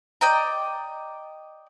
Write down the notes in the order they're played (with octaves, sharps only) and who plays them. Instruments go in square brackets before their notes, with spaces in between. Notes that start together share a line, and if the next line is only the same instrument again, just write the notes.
[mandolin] D5 D#5 G5 A#5